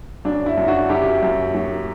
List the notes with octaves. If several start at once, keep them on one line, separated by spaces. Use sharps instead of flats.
F#2 D4
E4
F#2
D4 F#4
F#2 E4 G4
F#2
F#3